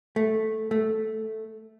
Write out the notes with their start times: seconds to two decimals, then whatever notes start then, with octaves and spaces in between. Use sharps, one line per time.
0.16 A3
0.71 A3